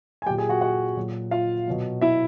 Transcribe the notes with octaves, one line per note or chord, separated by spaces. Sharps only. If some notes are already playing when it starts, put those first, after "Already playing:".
G#5
A#2 F#3 G4 G5
G#4 G#5
F#4 F#5
F#4 F#5
A#2 F#3
F4 F5
B2 F#3
E4 E5